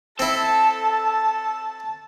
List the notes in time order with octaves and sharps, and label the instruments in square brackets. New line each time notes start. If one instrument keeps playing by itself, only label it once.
[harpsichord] C4 E4 [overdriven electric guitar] A4 [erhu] A5